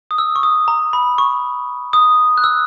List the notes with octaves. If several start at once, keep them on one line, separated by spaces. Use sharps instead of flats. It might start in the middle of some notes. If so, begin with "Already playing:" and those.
D#6
E6
C#6
D#6
A#5
B5
C#6
D#6
F#6
E6